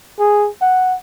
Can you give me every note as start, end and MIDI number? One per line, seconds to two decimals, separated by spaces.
0.19 0.48 68
0.61 0.95 78